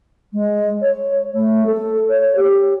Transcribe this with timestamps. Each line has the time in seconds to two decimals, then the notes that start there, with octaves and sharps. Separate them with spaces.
0.33 G#3
0.82 C#5
1.34 A3
1.66 A4
2.09 C#5
2.36 G4